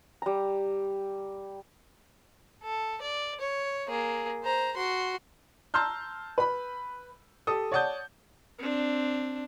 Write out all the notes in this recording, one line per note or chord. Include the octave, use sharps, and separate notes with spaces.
G3 A#5
A4
D5
C#5
A#3 G#4
C5 A#5
F#4 C6
A5 A#5 C6 E6 F6 G6
B4 B5
G4 A4 D#6
C#5 D5 F#5 A5 D#6 G6
C4 D4